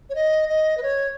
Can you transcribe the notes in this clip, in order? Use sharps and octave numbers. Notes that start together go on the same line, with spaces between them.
C#5
D#5
D#5
B4
C#5